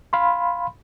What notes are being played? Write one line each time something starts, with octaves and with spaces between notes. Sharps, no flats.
F5 B5 C6